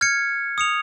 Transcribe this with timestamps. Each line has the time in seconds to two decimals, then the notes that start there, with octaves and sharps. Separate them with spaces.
0.01 F6 G#6 C#7
0.58 D#6 C#7 F7